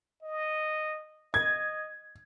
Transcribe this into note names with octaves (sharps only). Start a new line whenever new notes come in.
D#5
D#5 G#6